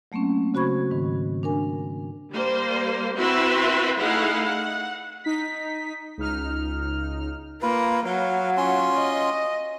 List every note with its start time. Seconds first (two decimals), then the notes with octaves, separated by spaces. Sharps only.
0.12 F#3 A3 A#3 C4 C#4
0.54 C#3 F#4 C5 B5 C#6 G#6
0.90 G#2 D#3
1.43 D4 A#4 G#5
2.31 G3 A#3 C5
3.16 C4 E4 F#4 B4 E5 C6
3.97 A3 D#4 E4 G#4 F5 F#5
4.44 F#5
5.24 D#4 B6
6.18 C#2 D#4 F6
7.62 A#3 F4 B4
8.06 F#3 F5
8.57 C#4 F4 C6
8.95 D#5